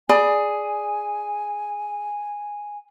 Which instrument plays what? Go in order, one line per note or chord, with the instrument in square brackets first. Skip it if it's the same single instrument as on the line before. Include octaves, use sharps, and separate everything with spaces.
[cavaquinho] G#4 [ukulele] D5 B5 [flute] G#5